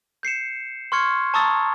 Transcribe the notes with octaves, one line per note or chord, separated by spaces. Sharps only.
G6 C7 C#7 E7
C6 C#6 F6 G#6 C#7
A5 A#5 C#6 D#6 E6 A6